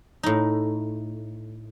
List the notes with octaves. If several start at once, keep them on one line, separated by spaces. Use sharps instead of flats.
A2 D#4